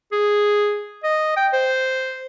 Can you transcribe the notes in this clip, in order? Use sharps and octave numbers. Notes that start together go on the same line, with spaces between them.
G#4
D#5
G5
C5